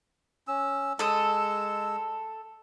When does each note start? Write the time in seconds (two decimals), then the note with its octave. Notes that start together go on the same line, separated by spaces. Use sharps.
0.48 C#4 E6
0.99 G#3 A4 D#6 E6